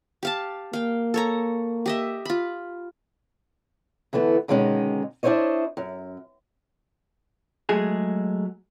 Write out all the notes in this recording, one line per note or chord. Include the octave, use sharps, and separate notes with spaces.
G4 F5 A5
A#3 F5 G5
A4 C#5 A#5
G4 D#5 E5
F4 B5
D3 E3 A3 B3
B2 D3 D#3 G#3 C#4 D#4
D4 E4 G4 C5 C#5 D#5
F#2
F#3 G#3 A3 G#4